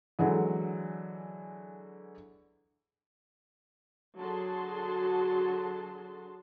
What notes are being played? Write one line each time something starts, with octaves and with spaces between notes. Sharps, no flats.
D3 E3 F#3 G#3
D3 F#3 F#4 G#4 A5 C6